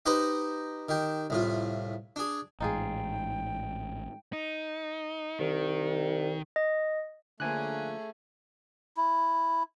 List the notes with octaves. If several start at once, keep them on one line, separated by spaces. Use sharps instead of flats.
D#4 G4 B4 C5 D#5 A#5
D#3 G4
C2 A2 F4
D4 G#4
A1 G#2 D#4 F4 G#4 G5
D#4
C2 D#3
D#5
D3 F3 A3 A#3 C#4 G#4 G#5 F#6
E4